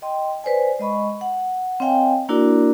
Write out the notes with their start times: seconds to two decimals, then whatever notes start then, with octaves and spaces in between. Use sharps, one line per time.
0.02 D#5 G5 C6
0.44 B4 C5 D5 G#5
0.79 G#3 D#5 B5 C#6
1.21 F#5
1.80 C4 C#5 D#5 F5 G5 G#5
2.29 A#3 D4 E4 F#4 A#4 D5